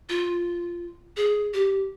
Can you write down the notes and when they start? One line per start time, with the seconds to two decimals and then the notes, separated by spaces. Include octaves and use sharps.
0.09 F4
1.17 G#4
1.54 G4